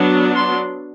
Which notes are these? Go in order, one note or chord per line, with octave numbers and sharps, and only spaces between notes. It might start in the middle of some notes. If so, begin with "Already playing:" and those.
Already playing: F#3 B3 D4
C6